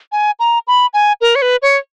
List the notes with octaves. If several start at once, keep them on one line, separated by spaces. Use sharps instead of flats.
G#5
A#5
B5
G#5
A#4
C#5
B4
C#5